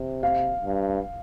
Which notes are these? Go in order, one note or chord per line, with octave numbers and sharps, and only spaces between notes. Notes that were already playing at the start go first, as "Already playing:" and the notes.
Already playing: C3
F5
G2